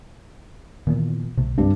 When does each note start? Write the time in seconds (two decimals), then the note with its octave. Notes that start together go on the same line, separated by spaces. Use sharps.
0.87 A#2 D#3 E3 B3
1.38 B1 C3 A3
1.58 C2 G2 C4 D4